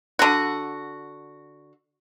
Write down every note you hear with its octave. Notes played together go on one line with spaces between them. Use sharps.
D3 F#4